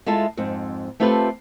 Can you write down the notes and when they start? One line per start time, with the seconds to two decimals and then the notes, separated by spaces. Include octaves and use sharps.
0.06 G#3 E4 F4 A4
0.37 F2 G#2 C4
1.00 A3 C4 F4 G4 A4 B4